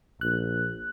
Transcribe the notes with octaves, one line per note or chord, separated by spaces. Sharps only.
A#1 F#6